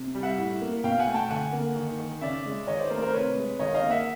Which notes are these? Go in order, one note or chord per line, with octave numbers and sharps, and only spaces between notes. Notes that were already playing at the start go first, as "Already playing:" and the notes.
Already playing: C3
G3
E5 F#5
A2
A#3
B2 F5 G5
F#5 G#5
A3
G5 A5
D3 F#5 G#5
A#3
D#3
D#3
C#3 D5 E5
G#3
D#3 C#5 D#5
C5 D5
A3 A#4 C5
A#4 C5
C3 B4 C#5
G#3
D#3 C#5 D#5
D#5 F5
A#3
E5 F#5